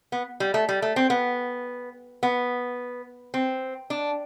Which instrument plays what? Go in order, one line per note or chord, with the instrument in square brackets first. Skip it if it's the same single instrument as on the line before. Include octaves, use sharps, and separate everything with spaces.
[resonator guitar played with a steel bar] B3
G3
A3
G3
A3
C4
B3
B3
C4
D4